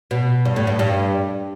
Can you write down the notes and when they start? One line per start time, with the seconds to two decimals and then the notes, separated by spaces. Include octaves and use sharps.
0.11 B2
0.45 G2
0.56 A2
0.67 G2
0.79 G2